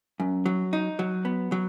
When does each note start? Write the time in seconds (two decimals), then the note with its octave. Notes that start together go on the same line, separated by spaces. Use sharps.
0.20 F#2
0.46 F#3
0.73 D#4
0.99 F#3
1.25 B3
1.52 F#3